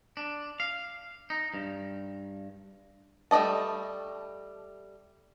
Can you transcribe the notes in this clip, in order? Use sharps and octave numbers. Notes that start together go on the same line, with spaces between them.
D4
F5
D#4
G2
G3 A3 D5 D#5 A5